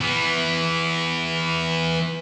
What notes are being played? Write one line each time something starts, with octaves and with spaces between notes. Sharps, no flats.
E3 B3